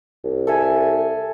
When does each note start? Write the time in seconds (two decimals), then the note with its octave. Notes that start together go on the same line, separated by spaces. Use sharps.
0.24 C2
0.47 A4 E5 G#5